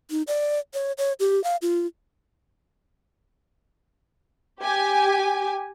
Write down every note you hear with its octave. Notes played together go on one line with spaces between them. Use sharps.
D#4
D5
C#5
C#5
G4
F5
F4
G4 G#5